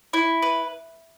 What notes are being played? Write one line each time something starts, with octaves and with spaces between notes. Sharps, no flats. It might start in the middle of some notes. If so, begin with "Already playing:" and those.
E4
B4